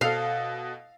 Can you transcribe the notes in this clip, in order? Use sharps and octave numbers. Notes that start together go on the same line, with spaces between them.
B2 A4 F5